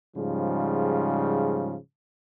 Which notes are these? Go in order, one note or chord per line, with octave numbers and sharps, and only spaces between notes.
G#2 C#3 F3 G3